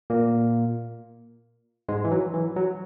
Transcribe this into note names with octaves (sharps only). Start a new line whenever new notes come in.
A#2 A#3
G#2 G#3
E3
F#3
E3
F#3